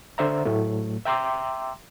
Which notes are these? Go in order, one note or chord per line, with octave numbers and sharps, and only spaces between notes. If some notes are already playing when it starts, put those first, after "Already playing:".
D3 C5 E5 A#5
A2 F#3 A3
E5 G5 A#5 C6 D6 E6